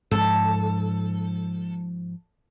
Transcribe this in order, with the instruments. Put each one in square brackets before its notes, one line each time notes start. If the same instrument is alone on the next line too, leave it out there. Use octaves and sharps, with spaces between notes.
[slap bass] G#2 F3 [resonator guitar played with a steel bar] A4